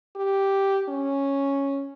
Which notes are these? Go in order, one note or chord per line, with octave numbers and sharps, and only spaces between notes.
G4
C#4